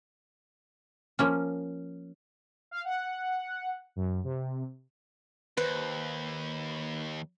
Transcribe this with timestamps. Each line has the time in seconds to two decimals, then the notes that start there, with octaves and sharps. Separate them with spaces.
1.19 F3 A#3 C#4
2.71 F5
2.85 F#5
3.96 F#2
4.24 C3
5.57 D#2 B4 C5